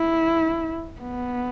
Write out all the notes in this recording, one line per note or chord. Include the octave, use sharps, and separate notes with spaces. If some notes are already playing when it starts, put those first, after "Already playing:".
Already playing: E4
B3